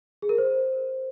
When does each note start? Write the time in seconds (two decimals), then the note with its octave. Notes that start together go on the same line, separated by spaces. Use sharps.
0.22 G#4
0.29 A#4
0.38 C5